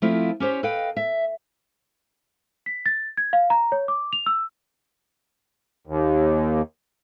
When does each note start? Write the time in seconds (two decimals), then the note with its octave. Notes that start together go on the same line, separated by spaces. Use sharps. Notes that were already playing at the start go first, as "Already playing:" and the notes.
0.02 F3 A3 C4 E4 F4
0.40 C#4 G4 C5 C#5
0.63 A4 B4 D#5 F5 G5
0.97 E5
2.66 B6
2.86 A6
3.17 G#6
3.33 F5
3.50 A#5
3.72 C#5
3.88 D6
4.13 F7
4.26 E6
5.87 D#2